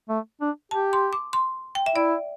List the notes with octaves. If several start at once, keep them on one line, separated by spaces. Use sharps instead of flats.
A3
D4
G4 A5
C6
D6
C6
G5
E5
E4 D5